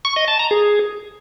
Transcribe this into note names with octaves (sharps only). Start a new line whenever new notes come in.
C#6
D#5
A5
A#5
G#4